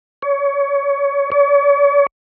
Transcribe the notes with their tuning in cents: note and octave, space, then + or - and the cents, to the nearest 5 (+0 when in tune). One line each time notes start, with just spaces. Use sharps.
C#5 +25
C#5 +45